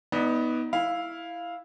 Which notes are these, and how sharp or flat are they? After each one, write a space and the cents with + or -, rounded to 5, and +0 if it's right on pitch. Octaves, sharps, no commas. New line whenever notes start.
B3 -5 D#4 +25 D5 +0
E4 +0 F5 +0